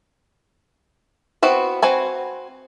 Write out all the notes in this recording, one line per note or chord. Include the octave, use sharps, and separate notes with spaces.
B3 C4 E4 F#4 B4
C4 F#4 B4 G#5